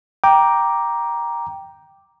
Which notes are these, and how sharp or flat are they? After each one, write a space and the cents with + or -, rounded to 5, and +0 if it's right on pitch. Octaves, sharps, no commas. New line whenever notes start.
G5 +0 A#5 +10 D6 +0